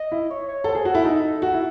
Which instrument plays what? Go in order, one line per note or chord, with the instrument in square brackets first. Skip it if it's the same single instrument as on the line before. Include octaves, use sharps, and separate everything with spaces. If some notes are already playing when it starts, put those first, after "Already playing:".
Already playing: [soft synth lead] D#5
[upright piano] E4
[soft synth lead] C#5
C#5
[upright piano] A4 [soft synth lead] C5
[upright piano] G#4 [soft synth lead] A4
[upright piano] F#4
[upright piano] E4 [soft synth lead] A4
[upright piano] D#4 [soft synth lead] A4
[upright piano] F#4
E4